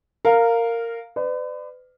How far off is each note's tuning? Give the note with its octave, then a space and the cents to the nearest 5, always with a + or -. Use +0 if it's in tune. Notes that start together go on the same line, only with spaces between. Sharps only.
A#4 -15 F5 +0
B4 +40 D5 +25